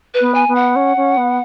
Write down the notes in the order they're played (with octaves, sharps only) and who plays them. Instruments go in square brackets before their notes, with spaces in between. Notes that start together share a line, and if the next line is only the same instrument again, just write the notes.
[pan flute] B4
[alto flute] B3
[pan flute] G#5
[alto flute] B3
[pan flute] F#5
[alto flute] C#4
C#4
B3